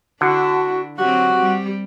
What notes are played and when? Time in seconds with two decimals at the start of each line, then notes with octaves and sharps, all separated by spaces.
0.21 D3 D4 E4 F#4
0.98 F#3 C4 F#4 G4
1.42 G3